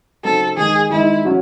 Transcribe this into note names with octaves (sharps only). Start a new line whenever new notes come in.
C#3 F#3 C4 D#4 A4
D#3 G#3 D#4 G#4
D#3 G#3 D#4 E4
F#3 C#4 F#4